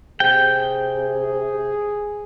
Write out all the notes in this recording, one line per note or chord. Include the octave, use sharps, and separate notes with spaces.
C3 G#4 G5